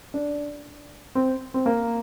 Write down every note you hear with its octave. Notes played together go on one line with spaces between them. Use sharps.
D4
C4
C4
A#3